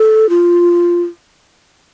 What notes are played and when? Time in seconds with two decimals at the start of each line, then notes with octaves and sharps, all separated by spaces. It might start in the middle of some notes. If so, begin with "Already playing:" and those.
Already playing: A4
0.29 F4